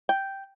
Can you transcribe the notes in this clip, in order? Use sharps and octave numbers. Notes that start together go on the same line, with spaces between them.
G5